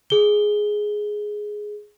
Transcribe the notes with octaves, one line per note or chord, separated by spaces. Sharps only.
G#4 G7